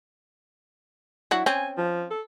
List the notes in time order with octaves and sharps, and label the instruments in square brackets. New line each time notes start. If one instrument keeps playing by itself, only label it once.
[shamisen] F#3 D4 F#4 [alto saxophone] E4
[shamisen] C4 C#4 [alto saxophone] G#5
[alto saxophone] F3
A4